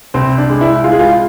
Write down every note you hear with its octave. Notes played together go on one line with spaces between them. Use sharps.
C2 C4
D4
G#3
E4
G#3 F4
G#4
F4